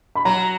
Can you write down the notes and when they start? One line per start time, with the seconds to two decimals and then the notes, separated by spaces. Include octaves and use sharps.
0.15 B5
0.25 F#3 A#5